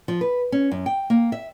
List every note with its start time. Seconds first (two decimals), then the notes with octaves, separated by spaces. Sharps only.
0.08 F3
0.21 B4
0.52 C#4
0.71 F#2
0.86 G5
1.10 A#3
1.32 E5